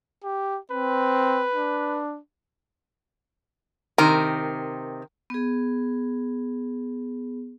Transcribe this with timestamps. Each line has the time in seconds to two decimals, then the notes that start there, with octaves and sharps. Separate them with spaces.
0.23 G4
0.71 C4 B4
1.55 D4
3.98 C3 D#3 A#4
5.30 B3 G#4